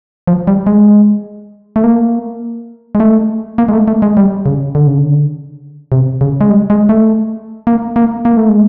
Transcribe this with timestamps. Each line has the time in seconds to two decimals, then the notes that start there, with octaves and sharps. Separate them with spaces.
0.27 F3
0.47 G3
0.67 G#3
1.76 A3
1.84 A#3
2.95 G#3
3.00 A3
3.58 A#3
3.69 G#3
3.73 A3
3.88 A3
4.02 G#3
4.17 G3
4.46 C#3
4.75 D3
4.87 C#3
4.98 D3
5.92 C3
6.21 C#3
6.41 G#3
6.50 G3
6.70 G#3
6.89 A3
7.67 A#3
7.96 A#3
8.25 A#3
8.37 A3
8.49 G#3